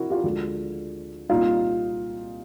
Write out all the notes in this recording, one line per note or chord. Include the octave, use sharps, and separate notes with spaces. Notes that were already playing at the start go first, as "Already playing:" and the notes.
Already playing: C3 E4 F#4 A#4
F4 G4
D2 D3 F3 G#3
C2 A#2 G3 D#4 F4